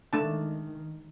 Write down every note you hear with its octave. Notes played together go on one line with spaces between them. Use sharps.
D#3 G#3 A3 D4 A5